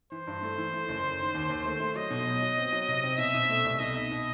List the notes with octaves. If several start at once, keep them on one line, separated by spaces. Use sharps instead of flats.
E3 C5
G2
A3
E3
A3
F#1
F#1
D#3
D#2
D#2
A3
A3
F#3 D#5
B2
F#3
F#3
C4
F#3
C3
C4
B2 E5
B2
A3
C2
B2 D#5
D#4
B2